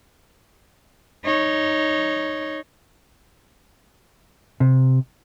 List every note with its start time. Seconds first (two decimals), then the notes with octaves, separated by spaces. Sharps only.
1.25 D#4 C#5
4.60 C3